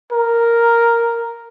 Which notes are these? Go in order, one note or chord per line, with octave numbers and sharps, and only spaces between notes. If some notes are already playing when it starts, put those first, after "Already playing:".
A#4